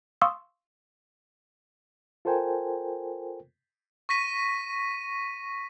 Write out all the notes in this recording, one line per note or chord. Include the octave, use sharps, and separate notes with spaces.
F5 C6 C#6 D#6 E6
F4 A4 A#4 C5 G5 G#5
C#6 A#6 B6 D#7